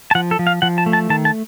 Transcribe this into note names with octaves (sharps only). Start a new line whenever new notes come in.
A5
F3 F#5
A4
F3
F5
F3 F#5
A5
A3
A5
D#3 A5
A5